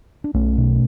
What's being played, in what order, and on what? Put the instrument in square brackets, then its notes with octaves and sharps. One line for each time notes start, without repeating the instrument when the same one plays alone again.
[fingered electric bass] D4
B1 A3 C#4
B2